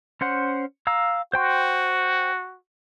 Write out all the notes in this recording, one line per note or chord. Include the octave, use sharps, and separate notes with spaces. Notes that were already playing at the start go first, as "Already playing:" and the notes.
C#4 C5 F#5
F5 A#5 E6
F#4 C5 G5 C6